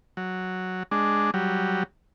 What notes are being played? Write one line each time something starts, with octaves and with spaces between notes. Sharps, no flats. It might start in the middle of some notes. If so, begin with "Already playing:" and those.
F#3
G#3 D4
F#3 G3